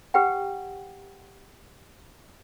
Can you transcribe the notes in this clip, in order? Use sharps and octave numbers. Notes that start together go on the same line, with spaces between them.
G4 B4 F#5 G5